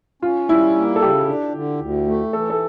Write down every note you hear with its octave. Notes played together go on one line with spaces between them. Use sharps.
C#4 F4
G3 E4
A#3
A4
C#3 G4
D4
D3
D2
A3
E3 A4
A4